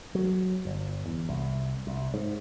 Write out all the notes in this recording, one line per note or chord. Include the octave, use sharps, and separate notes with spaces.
F#3
G1
E2
C2
C2
G#2